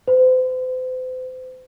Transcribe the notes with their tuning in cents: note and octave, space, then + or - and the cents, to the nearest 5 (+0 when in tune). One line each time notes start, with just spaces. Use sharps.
C5 -40